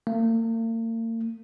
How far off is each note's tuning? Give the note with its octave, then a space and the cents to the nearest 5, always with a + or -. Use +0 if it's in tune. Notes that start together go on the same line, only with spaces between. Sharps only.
A#3 -45